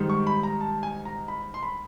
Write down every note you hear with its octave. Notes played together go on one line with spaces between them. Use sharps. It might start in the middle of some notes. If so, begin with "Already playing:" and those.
Already playing: G#2 D#3 G3
C#6
B5
A#5
A5
G#5
A#5
B5
C6
B5